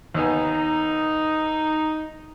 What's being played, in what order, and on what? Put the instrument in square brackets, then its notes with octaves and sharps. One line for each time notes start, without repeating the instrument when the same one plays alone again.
[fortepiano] D#2 B3 G#5 [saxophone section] D#4